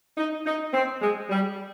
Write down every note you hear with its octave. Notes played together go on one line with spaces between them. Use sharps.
D#4
D#4
C4
G#3
G3